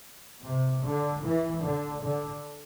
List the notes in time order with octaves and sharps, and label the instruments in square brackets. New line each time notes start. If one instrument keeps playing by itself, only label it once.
[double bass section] C3
D3
E3
D3
D3